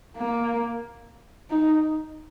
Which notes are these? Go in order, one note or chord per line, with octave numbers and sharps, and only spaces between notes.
A#3
D#4